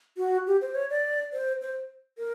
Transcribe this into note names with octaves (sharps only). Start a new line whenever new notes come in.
F#4
G4
C5
C#5
D5
C5
C5
A#4